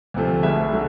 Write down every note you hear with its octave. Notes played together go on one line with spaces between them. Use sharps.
D2 C3 F3 A3
B1 B2 G#3 E5
D3 F#3 A3